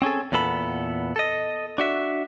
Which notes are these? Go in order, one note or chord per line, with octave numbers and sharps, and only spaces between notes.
C4 C#4 G#4 A4
E2 A#2 B3 A4 B5
A4 D#5
D4 F#4 E5